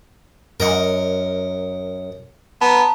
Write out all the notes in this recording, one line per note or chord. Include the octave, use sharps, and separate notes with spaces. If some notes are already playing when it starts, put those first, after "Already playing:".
F#2 A#4 D#5 F#5
B3 A5 A#5